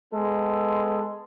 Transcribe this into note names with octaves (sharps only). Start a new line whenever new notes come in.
G#3 B3 A4